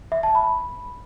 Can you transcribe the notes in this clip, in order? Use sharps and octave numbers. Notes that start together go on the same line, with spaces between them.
E5
A5
B5